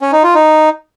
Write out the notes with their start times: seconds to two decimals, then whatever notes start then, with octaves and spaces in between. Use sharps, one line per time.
0.01 C#4
0.12 D#4
0.23 F4
0.35 D#4